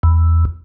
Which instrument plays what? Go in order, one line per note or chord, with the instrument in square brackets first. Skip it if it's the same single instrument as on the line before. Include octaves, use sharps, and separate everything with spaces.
[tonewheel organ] E2